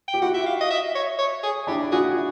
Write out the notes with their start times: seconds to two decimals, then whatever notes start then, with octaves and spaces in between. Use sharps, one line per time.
0.08 G5
0.14 G4
0.22 E4 F#4 F#5
0.34 E5
0.46 F5
0.61 D#5
0.71 E5
0.95 C#5
1.19 C#5
1.43 G#4
1.67 D4 E4 G4
1.92 E4 F#4 G#4